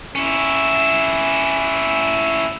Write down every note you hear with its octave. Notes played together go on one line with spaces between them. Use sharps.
C#4 E4